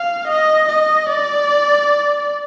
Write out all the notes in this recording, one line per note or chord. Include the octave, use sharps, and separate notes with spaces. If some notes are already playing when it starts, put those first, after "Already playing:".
Already playing: F5
D#5
D#5
D5